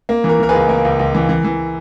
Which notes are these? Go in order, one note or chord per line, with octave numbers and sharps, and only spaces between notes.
A#3
E3
A#4
E3 A#4
G#4 B4
C#2
A#3 A#4
C#2
C#2
E3
E3
E3